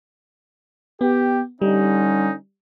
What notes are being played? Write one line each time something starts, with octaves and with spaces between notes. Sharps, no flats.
B3 G4
D3 G3 C#4 D#4